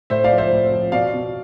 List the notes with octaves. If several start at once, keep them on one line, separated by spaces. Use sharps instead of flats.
A2 C5 E5
D5 F5
F3
C5 E5
A2
F3
B2 D5 F5
B2